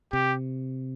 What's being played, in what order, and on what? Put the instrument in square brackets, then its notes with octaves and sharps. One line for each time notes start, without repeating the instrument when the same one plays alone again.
[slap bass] C3 [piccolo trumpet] G4